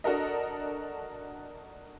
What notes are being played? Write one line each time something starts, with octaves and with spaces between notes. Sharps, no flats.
D4 F#4 A4 A#4 D#5